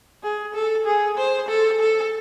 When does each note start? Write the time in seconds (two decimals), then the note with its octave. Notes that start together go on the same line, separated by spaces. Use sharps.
0.23 G#4
0.54 A4
0.85 G#4
1.17 C5
1.49 A4
1.80 A4